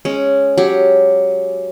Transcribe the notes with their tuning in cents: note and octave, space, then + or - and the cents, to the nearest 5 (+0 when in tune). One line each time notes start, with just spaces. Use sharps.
G#3 +0 C#4 +0
F#3 +0 G4 +0